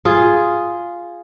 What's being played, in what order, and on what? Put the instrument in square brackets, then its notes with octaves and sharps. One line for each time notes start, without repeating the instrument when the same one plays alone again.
[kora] F4 G#4